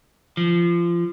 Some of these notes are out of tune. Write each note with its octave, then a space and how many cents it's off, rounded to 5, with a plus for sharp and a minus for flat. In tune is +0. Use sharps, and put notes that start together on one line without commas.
F3 -25